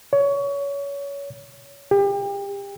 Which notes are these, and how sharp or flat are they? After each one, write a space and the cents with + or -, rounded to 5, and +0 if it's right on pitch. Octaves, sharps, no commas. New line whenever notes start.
C#5 +25
G4 +30